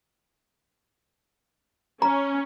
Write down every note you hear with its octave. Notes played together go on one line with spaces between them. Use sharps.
C#4 A#5